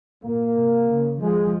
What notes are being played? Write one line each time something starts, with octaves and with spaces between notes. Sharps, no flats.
A#2 A#3
C3
C#3
F3 G#3